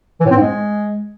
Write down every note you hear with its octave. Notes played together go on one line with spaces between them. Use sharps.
E3
A2
C4
G#2
G#3